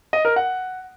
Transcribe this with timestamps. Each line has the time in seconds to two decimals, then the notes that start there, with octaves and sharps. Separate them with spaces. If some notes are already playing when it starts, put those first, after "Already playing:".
0.13 D#5
0.25 A#4
0.36 F#5